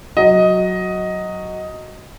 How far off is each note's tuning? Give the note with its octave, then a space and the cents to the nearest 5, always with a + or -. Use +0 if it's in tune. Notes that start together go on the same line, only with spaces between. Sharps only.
F#3 -5 F#4 +0 D#5 +10